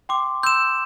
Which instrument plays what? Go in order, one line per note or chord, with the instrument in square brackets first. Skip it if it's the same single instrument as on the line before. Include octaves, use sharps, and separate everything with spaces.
[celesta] G5 C6 [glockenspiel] D6
[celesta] C6 E6 [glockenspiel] G6 E7